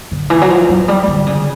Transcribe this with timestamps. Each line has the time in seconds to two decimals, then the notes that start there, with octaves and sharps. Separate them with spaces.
0.11 D3
0.30 E3
0.41 F#3
0.50 F3
0.69 F#3
0.88 G3
1.08 D3
1.27 C#3